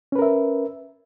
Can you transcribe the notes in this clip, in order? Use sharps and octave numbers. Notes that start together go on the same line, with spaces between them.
C#4 A#4 B4 E5